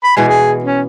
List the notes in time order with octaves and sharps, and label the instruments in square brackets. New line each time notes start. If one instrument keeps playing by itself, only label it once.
[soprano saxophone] B5
[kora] B2 E3 G#3 [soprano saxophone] G#5
[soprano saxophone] G#4
C#4